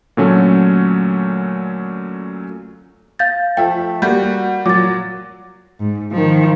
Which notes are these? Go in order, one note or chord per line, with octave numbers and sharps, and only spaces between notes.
A#2 D3 F#3 A3 C#4
F5 G6 A6
F3 A3 E5 G5
G3 A#3 F#4 G6
A#2 F#3 D6 A6
G#2
D#3 F3